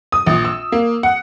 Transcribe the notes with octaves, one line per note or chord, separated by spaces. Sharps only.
D#6
A#1
E6
A#3
F#5